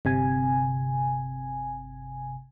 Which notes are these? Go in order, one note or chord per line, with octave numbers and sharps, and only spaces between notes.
G1 C3 G#5